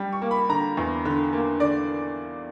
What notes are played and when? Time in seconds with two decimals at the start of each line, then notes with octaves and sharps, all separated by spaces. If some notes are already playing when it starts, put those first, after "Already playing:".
Already playing: G3
0.12 C#6
0.22 A#3
0.31 B5
0.49 D3 A#5
0.77 E2
1.05 D3
1.33 A#3
1.60 D3 D5